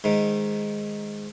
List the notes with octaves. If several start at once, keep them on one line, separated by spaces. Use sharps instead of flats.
G#2 D#3